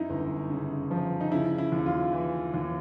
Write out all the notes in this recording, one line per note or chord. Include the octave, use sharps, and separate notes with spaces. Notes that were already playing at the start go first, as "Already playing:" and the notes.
Already playing: F#2 D#4 E4
G1
C#3
F3
D#4
C#3 E4
E4
D#2
F4
E3
D#2